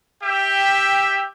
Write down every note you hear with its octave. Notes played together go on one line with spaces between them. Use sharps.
G4 E5 G5